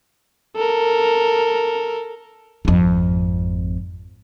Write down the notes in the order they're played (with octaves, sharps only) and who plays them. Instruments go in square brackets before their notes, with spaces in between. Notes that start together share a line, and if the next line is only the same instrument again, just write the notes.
[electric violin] A4 A#4
[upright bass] G#1 F2